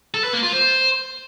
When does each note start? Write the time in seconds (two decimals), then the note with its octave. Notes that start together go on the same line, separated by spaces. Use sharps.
0.14 A4
0.24 B4
0.33 A#3
0.43 F4
0.52 C5